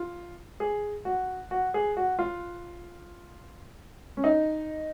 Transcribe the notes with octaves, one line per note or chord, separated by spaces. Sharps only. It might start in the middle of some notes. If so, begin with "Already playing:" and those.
Already playing: F4
G#4
F#4
F#4
G#4
F#4
F4
C#4
D#4